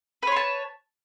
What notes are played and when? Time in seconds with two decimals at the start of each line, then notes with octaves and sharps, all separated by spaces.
0.23 B4
0.27 C#5
0.32 C6
0.36 A5